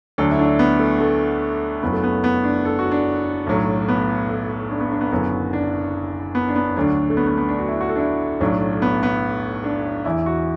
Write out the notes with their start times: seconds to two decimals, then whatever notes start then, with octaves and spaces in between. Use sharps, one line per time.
0.18 D2 D3 F#3 A4
0.31 E4
0.39 D4
0.45 E4
0.59 B3
0.79 A3
1.00 A3
1.82 F#1 F#2 F#3 B3
1.92 A3
2.03 B3
2.24 B3
2.44 D4
2.65 A4
2.79 F#4
2.91 D4
3.47 B1 A2 F#3
3.88 B3
4.29 A3
4.71 D4
4.80 B3
4.91 D4
5.01 B3
5.11 F#1 F#2 D3 F#3 B3
5.53 D4
6.35 B3
6.48 D4
6.56 B3
6.76 D2 D3 F#3 D4
7.10 A3
7.17 B3
7.27 B3
7.37 B3
7.49 D4
7.59 F#4
7.68 E4
7.81 F#4
7.89 A4
7.96 D4
7.99 E4
8.40 B1 A2 F#3 D4
8.82 B3
9.03 B3
9.64 D4
10.05 E2 E3 E4
10.26 F#4